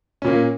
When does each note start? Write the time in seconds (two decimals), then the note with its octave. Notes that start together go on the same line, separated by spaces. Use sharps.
0.22 C#4
0.24 A#2
0.27 A#3